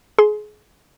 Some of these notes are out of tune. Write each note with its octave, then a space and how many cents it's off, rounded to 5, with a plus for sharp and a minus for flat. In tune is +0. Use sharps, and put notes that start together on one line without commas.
G#4 +25 C6 +0